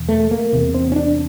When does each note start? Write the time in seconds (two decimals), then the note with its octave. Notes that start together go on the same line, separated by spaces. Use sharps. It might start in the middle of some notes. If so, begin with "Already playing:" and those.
Already playing: E2 B2
0.09 A3
0.31 A#3
0.53 E2 C3
0.74 C4
0.92 C#4
0.96 D4